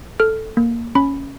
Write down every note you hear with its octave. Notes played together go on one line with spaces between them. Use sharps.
A4 F6
A#3
C#4 B5